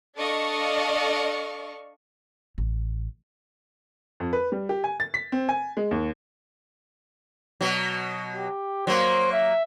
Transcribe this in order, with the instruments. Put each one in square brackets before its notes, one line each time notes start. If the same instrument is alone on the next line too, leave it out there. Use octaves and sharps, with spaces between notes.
[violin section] D4 A4 D5 D#5 F5 C#6
[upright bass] A1
[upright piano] F2
B4
G3
G4
G#5
A6
B6
C4
G#5
G#3
D#2
[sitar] B2 F#3
[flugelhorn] G4
[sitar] F#3 A#3 [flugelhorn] C5
[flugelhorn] E5